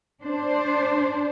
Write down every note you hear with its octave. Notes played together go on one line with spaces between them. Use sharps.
D4 C5